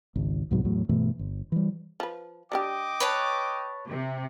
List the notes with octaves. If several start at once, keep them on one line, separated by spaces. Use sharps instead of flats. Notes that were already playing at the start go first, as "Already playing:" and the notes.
G#1 C#2
C2 G#2 B2 F#3
E2 A2 F#3
G2 B2 E3 A3
G1
E3 G3
F3 B4
G3 D4 G4 D#5 G5 D6
B4 C#5 A5
C3